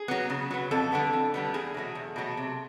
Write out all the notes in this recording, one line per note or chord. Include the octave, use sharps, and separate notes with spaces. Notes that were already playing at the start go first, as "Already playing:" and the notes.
Already playing: G#4
F#3 B3
C#3
F#3 B3
F2 A4
D3 G3 B3
F2
D3 G3 B3
E2 G#4
B2 F#3 A3
E2
B2 F#3 A3
C3